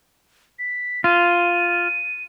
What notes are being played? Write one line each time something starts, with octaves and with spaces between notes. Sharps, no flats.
B6
F4 D#7